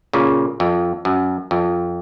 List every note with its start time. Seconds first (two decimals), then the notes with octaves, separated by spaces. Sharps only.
0.13 A#2 C#3
0.60 F2
1.05 F#2
1.51 F2